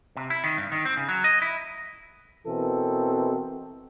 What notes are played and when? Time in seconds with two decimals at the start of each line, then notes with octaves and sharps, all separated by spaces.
0.17 C3
0.30 E4
0.44 D#3
0.57 G2
0.72 D#3
0.85 C4
0.97 C#3
1.09 F#3
1.24 D#5
1.42 E4
2.47 B2 E3 C4 A4 A#4